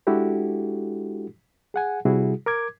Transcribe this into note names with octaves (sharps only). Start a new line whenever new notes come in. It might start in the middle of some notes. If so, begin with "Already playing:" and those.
G#3 D4 E4 F#4 G4 A4
G#4 F#5 G#5
C3 G3 E4 F#4 G#4
A#4 D6 G#6